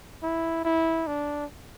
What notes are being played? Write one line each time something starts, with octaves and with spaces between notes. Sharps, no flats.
E4
E4
D4